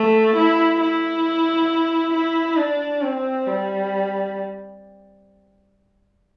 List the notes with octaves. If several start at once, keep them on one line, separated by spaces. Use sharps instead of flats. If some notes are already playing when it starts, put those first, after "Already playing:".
Already playing: A3
E4
E4
E4
D4
C4
G3